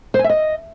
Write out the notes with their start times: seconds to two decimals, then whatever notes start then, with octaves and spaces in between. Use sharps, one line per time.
0.14 C5
0.19 G#5
0.24 E5
0.29 D#5